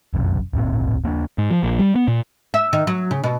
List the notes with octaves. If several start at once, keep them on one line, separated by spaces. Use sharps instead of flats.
F1 B1 F#2
D1 G#1 A#2 C4
D#2 A#3 B3 D4
G#2
F3
A#1
G3
B3
A#2
E5
D#3
F#3
C#3
B2